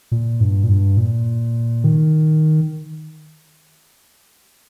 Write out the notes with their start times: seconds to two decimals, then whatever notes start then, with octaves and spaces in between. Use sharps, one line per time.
0.12 A#2
0.40 G2
0.63 A#2
0.69 G2
0.97 A#2
1.84 D#3